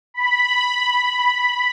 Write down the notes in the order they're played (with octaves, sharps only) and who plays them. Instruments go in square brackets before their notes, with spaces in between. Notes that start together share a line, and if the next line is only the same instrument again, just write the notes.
[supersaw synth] B5